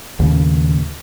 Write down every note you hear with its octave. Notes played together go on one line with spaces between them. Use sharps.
D#2 A2 C#3